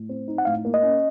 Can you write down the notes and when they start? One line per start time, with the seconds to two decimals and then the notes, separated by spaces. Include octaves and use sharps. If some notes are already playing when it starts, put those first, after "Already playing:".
Already playing: A2
0.09 C4
0.28 D#4
0.38 F#5
0.45 A2 F5
0.65 A#3
0.74 D#5
0.83 C#4